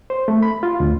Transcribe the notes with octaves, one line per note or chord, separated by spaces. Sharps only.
C5
A3
B5
F4
D2